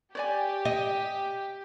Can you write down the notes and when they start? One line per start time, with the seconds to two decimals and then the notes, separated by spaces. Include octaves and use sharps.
0.15 G4 C#5 D5 G#5
0.65 D#5